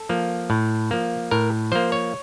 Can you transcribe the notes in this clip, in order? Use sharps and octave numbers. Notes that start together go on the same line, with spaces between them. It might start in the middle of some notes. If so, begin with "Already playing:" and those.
Already playing: A4
F3 A#3
A2
F3 A#3
A2 A#4
F3 A#3 C5
C#5